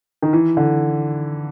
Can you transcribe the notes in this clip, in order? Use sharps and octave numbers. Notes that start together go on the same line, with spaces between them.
D#3
E3
D3